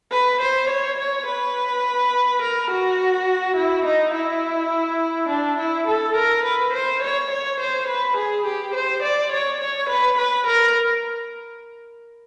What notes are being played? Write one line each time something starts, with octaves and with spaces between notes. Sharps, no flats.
B4
C5
C#5
C#5
B4
A#4
F#4
E4
D#4
E4
D4
E4
A4
A#4
B4
C5
C#5
C#5
C5
B4
G#4
G4
C5
D5
C#5
C#5
B4
B4
A#4